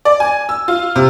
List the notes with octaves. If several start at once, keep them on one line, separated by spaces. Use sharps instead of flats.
D5
G#5
E6
F4
C3